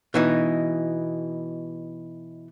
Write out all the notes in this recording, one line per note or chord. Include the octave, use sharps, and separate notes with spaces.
B2 E3 D#4